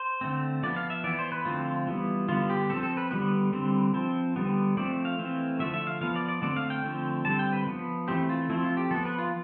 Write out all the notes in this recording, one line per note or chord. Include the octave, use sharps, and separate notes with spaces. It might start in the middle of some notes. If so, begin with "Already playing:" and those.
Already playing: C5
D3 A3 C4
F3 B3 D5
F5
E5
E3 B3 D5
C5
B4
D3 F3 A3 C4 F4
E3 G3 B3
D3 G3 B3 F4
G4
F3 C4 A4
A4
B4
D3 G3 B3 B4
D3 G3 C4
F3 C4
D3 G3 B3
F3 A3 C4 D5
F5
E3 A3 C4
D3 F3 A3 E5
E5
F5
F3 B3 F5
D5
D5
D3 A3 C4 D5
F5
G5
D3 F3 A3 C4
D3 G3 C4 A5
G5
B4
F3 B3
E3 A3 C4 G4
F4
F3 A3 C4 E4
F4
G4
F3 B3 A4
B4
F4